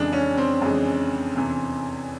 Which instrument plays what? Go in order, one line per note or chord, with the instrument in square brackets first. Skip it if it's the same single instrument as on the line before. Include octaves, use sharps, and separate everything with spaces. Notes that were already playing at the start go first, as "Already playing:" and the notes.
Already playing: [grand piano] F2 C#3 E3 G#3 [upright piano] D4
[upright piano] C#4
C4
[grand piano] F2 C#3 E3 G#3
E2 C3 E3